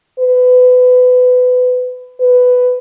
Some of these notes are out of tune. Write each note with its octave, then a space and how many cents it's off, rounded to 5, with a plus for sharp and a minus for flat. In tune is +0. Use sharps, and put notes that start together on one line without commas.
B4 +25
B4 +10